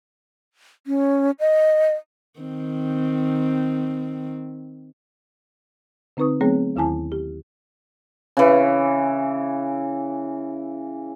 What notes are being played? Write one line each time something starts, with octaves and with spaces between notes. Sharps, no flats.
C#4
D#5
D#3 C4
D3 C4 D#4 B4 C#6 D#6
F#3 A3 B3 C4 G#4 C#5
D#2 D#3 E4 G#5 A5
G4
C#3 E3